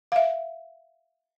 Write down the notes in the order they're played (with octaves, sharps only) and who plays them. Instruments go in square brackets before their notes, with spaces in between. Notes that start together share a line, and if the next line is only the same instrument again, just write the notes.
[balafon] E5 F5